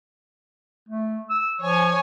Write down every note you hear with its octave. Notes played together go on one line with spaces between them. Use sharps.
A3
E6
F3 C#5 G#5